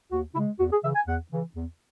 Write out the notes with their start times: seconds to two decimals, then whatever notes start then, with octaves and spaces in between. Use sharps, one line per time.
0.12 D#2 F#4
0.35 C#3 G#3 E4
0.59 E2 F#4
0.72 G#4
0.83 C#3 E3 E5
0.95 G#5
1.07 E2 F#5
1.31 C#3 E3
1.55 E2